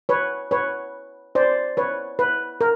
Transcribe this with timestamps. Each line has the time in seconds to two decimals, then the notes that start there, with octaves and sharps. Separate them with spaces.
0.09 B4 C#5
0.51 B4 C#5
1.35 C5 D5
1.77 B4 C#5
2.19 B4
2.61 A#4